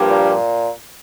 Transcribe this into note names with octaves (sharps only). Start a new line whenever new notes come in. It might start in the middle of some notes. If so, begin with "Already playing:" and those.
Already playing: G2 F3 A#3 G4
A#2